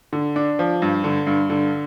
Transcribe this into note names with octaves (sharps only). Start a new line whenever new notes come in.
D3
D4
F3
G2
D3
G2
D3